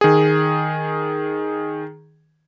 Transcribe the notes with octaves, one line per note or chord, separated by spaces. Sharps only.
D#3 G#4